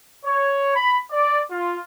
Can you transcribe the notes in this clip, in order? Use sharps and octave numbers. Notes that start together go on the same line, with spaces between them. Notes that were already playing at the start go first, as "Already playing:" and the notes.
C#5
B5
D5
F4